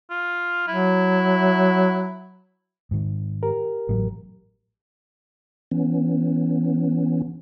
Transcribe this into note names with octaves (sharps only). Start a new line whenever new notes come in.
F4
F#3 E4
G#2 D#3
G4 A#4
A1 A2 F#3
E3 B3 C#4